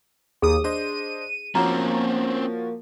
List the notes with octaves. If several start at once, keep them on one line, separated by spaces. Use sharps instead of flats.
D#2 G#4 D#6
D4 C5 D#5 D#7
F3 A#3 C4 C#4 F#4 C#5 A#5